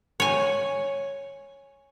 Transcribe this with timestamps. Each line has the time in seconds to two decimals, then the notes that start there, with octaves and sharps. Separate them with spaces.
0.20 C#5 G#5